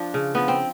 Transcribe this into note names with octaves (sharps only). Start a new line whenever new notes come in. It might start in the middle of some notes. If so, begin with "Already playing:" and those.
Already playing: F3 D4
C#3
F3 B3
C4